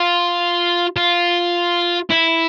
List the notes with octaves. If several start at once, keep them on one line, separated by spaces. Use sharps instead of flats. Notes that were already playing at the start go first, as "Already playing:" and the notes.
Already playing: F4
F4
E4